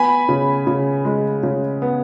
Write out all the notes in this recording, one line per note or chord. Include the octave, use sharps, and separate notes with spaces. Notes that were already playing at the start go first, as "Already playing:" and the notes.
Already playing: B3 G#5 B5
C#3
C#3
G#3
C#3
B3